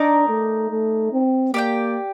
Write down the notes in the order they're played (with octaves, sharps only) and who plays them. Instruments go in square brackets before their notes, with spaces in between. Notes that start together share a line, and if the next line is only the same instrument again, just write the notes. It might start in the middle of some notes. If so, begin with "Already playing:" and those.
Already playing: [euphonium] D4 [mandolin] D#4 A#4 D5
[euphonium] A3
A3
C4
[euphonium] A#3 [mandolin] G4 D5 G5